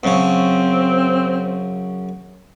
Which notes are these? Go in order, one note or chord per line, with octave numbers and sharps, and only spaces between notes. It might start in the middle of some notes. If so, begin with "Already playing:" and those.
F#2 C#3 C4